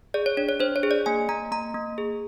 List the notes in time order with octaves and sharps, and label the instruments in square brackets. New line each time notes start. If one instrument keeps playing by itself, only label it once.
[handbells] G#4 D5
C#5
D4 C#5
C#5
D4 C5
C#5
G#4
D5
A#3 G#5
A#3 A#5
A#3 A#5
A#3
G#4